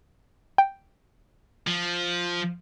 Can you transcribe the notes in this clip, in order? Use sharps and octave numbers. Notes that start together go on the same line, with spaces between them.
G5
F3